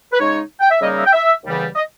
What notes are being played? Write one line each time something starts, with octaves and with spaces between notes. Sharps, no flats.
B4
C#3 G#3 D#4 C#5
G5
E5
C#3 G3 A#3 D#4 D#5
E5
G5
E5
D#2 C#3 E3 G3 B3
D#5